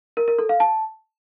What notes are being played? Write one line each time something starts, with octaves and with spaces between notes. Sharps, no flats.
A#4
A#4
A4
F5
A5